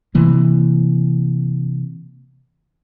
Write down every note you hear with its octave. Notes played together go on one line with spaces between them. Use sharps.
C3 E3 A#3